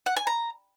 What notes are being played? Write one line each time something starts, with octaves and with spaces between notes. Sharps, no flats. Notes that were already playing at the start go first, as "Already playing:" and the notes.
F#5
G#5
A#5